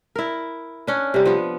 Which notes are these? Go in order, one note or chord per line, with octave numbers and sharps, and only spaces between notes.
E4 A#4
C#4 D4
C3 G3
F3 B3